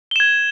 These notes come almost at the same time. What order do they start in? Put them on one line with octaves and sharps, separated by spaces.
G7 E7 G#6